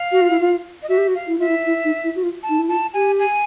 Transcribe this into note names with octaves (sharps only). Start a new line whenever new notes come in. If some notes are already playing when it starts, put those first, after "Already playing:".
Already playing: F5
F#4
F4
E4
F4
D#5
F#4 E5
G4
F#4
F5
E4
F4 E5
E4
E4
D#4
E4
F#4
F4
A5
D#4
E4
F4 A5
G4 G#5
G#5